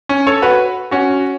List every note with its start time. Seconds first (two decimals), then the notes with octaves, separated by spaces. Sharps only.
0.09 C#4
0.27 A4 C#5
0.42 F#4 B4
0.91 C#4 F#4